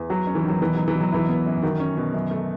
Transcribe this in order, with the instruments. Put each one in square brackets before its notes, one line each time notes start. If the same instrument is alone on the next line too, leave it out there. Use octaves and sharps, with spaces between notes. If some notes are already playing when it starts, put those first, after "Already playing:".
Already playing: [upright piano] E2
[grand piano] F#3 [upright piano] F#4
[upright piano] C#4
[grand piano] E3
[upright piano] D#3 [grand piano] F#3
[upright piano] B2 [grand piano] E3
[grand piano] F#3 [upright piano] D#4
[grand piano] E3
[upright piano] B2
[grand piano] F#3
[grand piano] E3 [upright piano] E4
[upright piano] B3
F#2
[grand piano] D#3 [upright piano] F#4
[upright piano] C#4
B2
F#2
A3